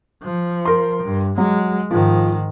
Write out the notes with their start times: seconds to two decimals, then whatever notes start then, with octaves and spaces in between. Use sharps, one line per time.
0.22 F3
0.65 A#4 C6
1.03 G2
1.38 F#3 G#3
1.91 G#2 D#3 F3